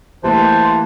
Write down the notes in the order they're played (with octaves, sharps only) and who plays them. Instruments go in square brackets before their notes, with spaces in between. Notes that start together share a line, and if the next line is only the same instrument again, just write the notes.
[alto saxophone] E3 [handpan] A3 A#3 G4 [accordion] C5 [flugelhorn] A5